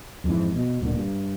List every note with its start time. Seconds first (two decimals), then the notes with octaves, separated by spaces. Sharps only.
0.24 F2 G#2 C3 E3
0.55 B2
0.81 D1 A#2 D3
0.95 G2